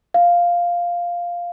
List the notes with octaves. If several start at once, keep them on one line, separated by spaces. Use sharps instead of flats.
F5